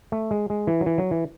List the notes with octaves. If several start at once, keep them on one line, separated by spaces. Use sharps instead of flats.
A3
G#3
G#3
E3
F#3
E3
F#3
E3